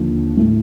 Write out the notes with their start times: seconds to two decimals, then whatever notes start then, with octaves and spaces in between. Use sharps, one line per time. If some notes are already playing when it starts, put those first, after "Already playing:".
Already playing: D#2 D3 F3
0.37 A2 A3